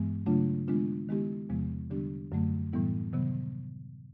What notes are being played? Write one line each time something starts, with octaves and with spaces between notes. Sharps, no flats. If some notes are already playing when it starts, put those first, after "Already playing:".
Already playing: G2 E3 G#3 B3
C#3 F#3 A3 D4 F4
D#3 G#3 B3 D4 F4
D#3 G#3 B3 E4 G4
E2 C3 F3 G#3 B3
D3 G3 B3 D4 G4
F#2 D3 F#3 A3
A2 E3 G3 B3 E4
C3 D#3 F#3 B3